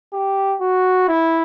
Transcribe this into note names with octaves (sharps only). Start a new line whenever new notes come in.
G4
F#4
E4